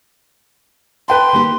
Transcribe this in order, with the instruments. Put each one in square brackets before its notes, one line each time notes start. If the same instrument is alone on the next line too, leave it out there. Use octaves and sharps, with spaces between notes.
[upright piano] B4 G5 A5 [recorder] C6
[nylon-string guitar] D#3 A#3 G4